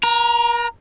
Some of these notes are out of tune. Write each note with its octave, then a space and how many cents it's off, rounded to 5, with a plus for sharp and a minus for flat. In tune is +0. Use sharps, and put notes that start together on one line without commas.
A#4 +40 A#5 +0